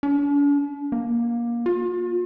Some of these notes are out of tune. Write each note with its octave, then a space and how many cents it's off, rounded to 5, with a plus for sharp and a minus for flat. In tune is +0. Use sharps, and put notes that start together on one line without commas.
D4 -45
A#3 +20
F4 +40